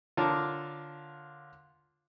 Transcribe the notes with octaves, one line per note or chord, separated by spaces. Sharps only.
D3 F4 A#4 C#5 A5 D6